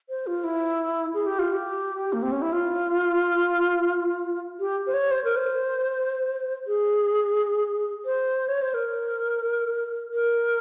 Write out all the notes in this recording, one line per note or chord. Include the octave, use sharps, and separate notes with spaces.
C5
F4
E4
G#4
G4
F4
G4
A#3
C4
C#4
E4
F4
G4
C5
C#5
C5
A#4
C5
G#4
C5
C#5
C5
A#4
A#4